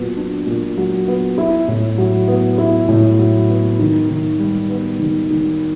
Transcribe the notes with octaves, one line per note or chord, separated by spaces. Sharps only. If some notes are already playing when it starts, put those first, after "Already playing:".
Already playing: A#2 F#3 B3
D4
A#2
F#3
B3
E4
A2
F#3
B3
E4
A2
F#3
B3
D#3
D#3
G3
B3
D#3
D#3